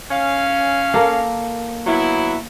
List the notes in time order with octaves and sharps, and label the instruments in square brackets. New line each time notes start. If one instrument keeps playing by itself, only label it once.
[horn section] C#4 F5
[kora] A#3 A4 A#4
[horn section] F#3 B3 E4